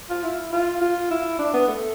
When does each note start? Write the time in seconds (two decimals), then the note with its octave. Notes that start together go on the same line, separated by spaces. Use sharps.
0.10 F4
0.24 E4
0.53 F4
0.81 F4
1.11 E4
1.39 D4
1.54 B3
1.68 A3